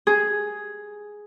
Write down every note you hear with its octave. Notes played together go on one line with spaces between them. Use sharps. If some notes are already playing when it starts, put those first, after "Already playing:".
G#4